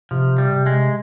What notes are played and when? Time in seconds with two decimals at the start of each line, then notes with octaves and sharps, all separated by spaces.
0.11 C3 F3
0.38 G3
0.52 C3
0.66 G#3